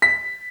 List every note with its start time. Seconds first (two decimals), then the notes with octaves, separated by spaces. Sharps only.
0.02 B6